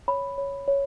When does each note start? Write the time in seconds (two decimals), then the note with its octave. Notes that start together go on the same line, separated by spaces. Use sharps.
0.08 C#5 B5
0.38 C#5
0.68 C#5